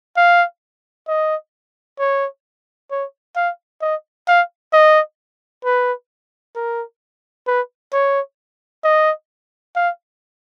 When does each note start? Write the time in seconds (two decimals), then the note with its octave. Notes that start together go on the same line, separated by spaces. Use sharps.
0.17 F5
1.08 D#5
1.99 C#5
2.91 C#5
3.36 F5
3.82 D#5
4.28 F5
4.73 D#5
5.65 B4
6.56 A#4
7.47 B4
7.93 C#5
8.84 D#5
9.76 F5